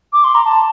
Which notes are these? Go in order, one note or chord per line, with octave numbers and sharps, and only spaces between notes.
D6
C6
A#5
A5